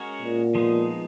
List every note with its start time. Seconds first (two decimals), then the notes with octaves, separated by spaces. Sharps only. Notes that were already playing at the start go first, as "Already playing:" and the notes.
Already playing: G#3 C#4 F#4 A#4 C#5
0.22 A#2
0.55 F3 G#3 B3 D#4